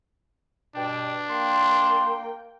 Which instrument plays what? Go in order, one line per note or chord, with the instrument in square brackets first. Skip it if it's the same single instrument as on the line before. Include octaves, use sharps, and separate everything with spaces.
[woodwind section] G2 B2 G5 [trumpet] D4
[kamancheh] A#3 G5 [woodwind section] C6